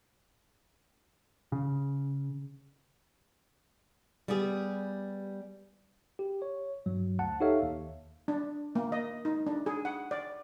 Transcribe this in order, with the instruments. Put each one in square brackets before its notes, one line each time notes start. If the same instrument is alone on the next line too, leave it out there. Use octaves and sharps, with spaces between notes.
[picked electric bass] C#3
[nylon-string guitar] G3 B3 G4 G#4
[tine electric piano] G4
C#5
G2 F#3
D2 F#5 A5
D#4 G4 A4 C#5 E5 F5
D#2
[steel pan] D4
A#3
D#5
D#4
D4
G#4
F#5
D5